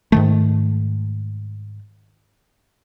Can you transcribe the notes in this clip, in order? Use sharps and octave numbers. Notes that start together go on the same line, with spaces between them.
G#2 D#3 A3